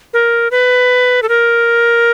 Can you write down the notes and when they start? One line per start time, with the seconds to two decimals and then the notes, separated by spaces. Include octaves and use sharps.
0.13 A#4
0.51 B4
1.23 A4
1.29 A#4